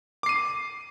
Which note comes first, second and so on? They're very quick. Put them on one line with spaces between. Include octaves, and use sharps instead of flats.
D6 C7 D#7